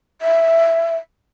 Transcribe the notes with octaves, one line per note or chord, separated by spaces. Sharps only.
E5